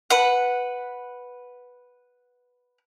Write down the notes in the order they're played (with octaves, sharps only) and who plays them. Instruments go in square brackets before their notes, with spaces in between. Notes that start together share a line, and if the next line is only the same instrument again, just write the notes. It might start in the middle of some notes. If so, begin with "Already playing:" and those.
[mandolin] B4 F#5